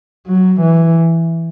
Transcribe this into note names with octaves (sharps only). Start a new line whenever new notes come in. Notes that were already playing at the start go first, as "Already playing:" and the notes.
F#3
E3